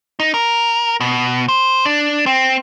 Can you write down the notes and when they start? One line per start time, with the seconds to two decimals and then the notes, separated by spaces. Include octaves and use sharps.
0.20 D#4
0.34 A#4
1.00 B2
1.48 C5
1.85 D4
2.26 C4